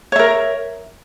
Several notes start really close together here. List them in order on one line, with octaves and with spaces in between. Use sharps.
C#5 E5 A#4